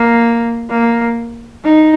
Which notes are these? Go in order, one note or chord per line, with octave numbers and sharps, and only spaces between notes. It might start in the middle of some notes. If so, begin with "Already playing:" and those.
Already playing: A#3
A#3
D#4